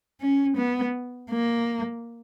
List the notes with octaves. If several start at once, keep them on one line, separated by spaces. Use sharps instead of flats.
C#4
B3
A#3